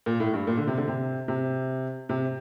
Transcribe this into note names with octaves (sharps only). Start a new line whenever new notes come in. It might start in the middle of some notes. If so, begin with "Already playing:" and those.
A#2
A2
G2
A#2
D3
C3
D3
C3
C3
C3